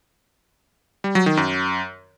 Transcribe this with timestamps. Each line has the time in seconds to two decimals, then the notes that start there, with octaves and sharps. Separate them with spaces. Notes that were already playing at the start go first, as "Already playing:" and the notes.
1.04 G3
1.15 F#3
1.26 D#3
1.37 F#2